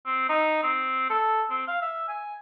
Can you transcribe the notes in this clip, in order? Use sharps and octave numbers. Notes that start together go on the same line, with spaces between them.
C4
D#4
C4
A4
C4
F5
E5
G#5